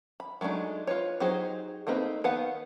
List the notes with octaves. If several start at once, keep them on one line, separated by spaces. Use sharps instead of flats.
B5
F#3 G#3 A3 D4 D#4
F4 B4 C#5
F#3 D#4 G4 G#4 C5
A3 A#3 C4 D#4 B4
D#3 B3 B4 F5 F#5